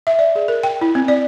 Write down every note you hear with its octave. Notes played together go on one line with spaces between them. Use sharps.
E5
D5
G#4
A#4
G5
E4
C4
D5